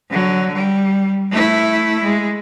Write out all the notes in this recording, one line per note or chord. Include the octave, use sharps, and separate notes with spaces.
D3 F#3
G3
A3 E4
G#3